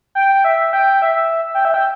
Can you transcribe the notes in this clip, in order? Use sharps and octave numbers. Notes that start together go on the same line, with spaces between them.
G5
E5
G5
E5
G5
E5
G5